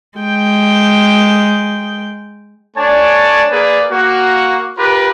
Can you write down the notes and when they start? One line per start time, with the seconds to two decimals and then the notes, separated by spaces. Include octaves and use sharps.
0.19 G#3 G5
2.77 A3 D4 C#5 D5 G#5 A5
3.51 A#3 G#4 B4 D5
3.91 A#3 F#4
4.78 F4 G4 A#4 B4